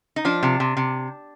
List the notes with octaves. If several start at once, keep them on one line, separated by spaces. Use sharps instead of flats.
D#4
F3 D4
C3
C3
C3